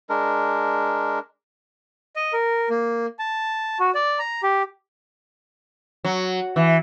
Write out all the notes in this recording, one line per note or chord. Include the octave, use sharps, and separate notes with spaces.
G#3 D4 A#4
D#5
A#4
A#3
A5
F#4
D5
A#5
G4
F#3
E3